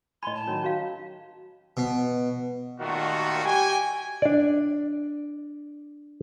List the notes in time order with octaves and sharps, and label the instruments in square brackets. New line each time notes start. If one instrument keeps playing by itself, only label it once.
[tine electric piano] A2 G#5 [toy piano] D#5 B5 [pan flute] C6
[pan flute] A5
[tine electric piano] D#3 F#3 [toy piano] C#4
[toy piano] C#4 F#4 F5
[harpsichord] B2
[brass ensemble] A#2 D#3 G3 A3 F4 F#4
G4 G5 G#5
[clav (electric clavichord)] D4 D5